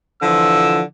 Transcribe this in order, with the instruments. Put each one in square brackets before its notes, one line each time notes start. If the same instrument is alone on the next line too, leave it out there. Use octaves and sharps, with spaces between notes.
[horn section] D3 E3 F3 [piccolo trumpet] E6